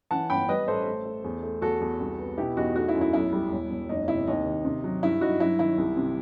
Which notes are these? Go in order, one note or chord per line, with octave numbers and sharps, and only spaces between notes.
E3 F#5 A5
G1 G5 B5
G3 B4 D#5
A1 A4 C5
A3
A3
E2
A3
E2 F#4 A4
E2
C2
B3
B2 E4 G4
E2 D#4 F#4
A3 D#4 F#4
E4
F#2
E4
B1 E4
G3
E1
E1
F#1 D#4
C3 E4
D#2 D#4
D#3
C3
F#3
G2 E4
G2 D#4 F#4
F#3 E4
D#3 E4
C2
C3